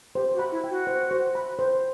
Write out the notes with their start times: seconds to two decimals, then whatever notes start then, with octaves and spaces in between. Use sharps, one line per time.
0.15 G4 C5
0.34 F#4
0.39 B5
0.52 E4
0.64 G5
0.70 F#4
0.87 C5
1.11 C5
1.35 B5
1.59 C5